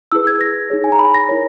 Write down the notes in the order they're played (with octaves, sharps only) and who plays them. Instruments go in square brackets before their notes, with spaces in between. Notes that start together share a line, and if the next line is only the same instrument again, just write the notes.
[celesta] E4 G#4 B4 E6
G#6
A#6
D#4 G#4 C#5
G#5
A#5
B5
A#6
E4 A#4 C#5